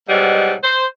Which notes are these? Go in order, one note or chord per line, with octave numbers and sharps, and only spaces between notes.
G#2 B2 F#3 G3
C5